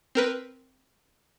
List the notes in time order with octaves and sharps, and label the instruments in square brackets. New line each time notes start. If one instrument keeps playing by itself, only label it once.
[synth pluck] C4 A#4 B4